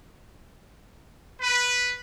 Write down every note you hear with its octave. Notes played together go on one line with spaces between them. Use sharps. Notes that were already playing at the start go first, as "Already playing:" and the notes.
B4